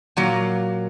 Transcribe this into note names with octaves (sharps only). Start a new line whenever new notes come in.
A#2 F#3 A#3